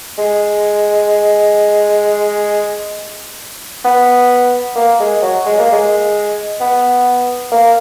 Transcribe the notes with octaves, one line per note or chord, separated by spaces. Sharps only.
G#3
B3
A#3
G#3
F#3
G#3
A#3
G#3
B3
A#3